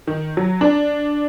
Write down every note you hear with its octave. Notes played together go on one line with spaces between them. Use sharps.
D#3
F#3
D4